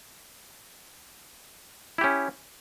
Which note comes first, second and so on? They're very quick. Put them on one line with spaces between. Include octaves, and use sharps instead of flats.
E4 G4 C#4